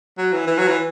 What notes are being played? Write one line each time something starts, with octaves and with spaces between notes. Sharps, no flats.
F#3
E3
E3
F#3
E3